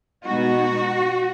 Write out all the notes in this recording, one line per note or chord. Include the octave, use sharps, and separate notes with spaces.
B2 G#3 B3 D#4 F#4